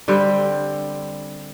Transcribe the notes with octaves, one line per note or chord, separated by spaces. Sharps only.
D3 G3 C4 G5